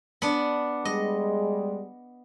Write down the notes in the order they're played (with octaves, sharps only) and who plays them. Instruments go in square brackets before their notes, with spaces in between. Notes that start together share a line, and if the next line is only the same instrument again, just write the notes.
[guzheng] B3 D4
[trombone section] G3 G#3 [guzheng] D#5